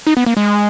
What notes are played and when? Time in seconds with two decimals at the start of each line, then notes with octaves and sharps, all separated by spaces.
0.07 D#4
0.17 B3
0.26 A#3
0.37 G#3